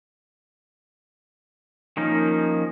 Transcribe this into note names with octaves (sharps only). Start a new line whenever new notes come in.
D#3 F3 A#3 C#4 D#4